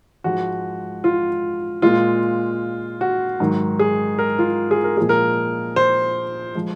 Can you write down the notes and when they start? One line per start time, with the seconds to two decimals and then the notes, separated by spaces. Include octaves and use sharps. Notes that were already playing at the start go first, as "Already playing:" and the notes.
0.24 G#2 F3 G#3 F#4
1.04 F4
1.82 A#2 G#3 F4
3.01 F#4
3.40 G#2 D#3 F#3
3.79 G#4
4.19 A#4
4.39 F4
4.71 G#4
4.84 A#4
4.97 A#2 F3 G#3 G#4
5.09 A#4
5.76 C5
6.55 F3 G#3